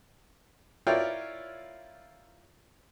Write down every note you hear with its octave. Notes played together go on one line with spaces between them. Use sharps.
E4 F4 A#4 C#5 D5 G5